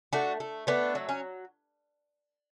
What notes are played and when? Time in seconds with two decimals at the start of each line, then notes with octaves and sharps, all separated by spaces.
0.13 A3 D4 F#4
0.40 A3
0.67 A3 B3 D4
0.95 F#3
1.09 C#4